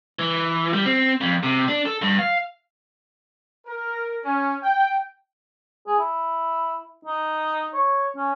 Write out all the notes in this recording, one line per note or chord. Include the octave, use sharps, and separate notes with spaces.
E3
G3
C4
F2
C3
D4
A4
G2
F5
A#4
C#4
G5
G#4
E4
D#4
C#5
C#4